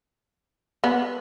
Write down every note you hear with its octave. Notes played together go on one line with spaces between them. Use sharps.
B3